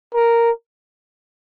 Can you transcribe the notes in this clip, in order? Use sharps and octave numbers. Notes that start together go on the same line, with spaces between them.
A#4